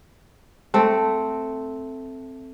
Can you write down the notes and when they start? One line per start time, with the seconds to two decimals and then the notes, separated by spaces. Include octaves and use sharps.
0.74 A3 C4